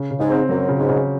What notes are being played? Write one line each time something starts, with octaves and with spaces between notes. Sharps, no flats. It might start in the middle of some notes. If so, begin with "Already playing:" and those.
Already playing: C#3
C#3
G#2
C4
F#2 F#3
C#3
G#2
C#3